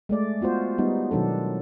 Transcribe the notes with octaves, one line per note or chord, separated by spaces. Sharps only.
G#3 A3 D5
B3 F4 F#4 C5
G3 B3 D#4
B2 D#3 F#3 D4 A4